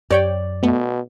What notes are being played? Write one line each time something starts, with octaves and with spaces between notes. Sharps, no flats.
F#2 G4 C#5 D5 G5
B2 A3 B3